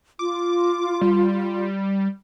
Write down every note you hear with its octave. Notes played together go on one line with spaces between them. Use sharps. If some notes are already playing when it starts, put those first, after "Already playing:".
F4 D6
G3